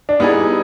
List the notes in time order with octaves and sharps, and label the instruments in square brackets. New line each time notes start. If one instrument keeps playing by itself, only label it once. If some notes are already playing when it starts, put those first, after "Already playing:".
[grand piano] D4
[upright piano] G3 B3 E4 G#4 [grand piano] D#4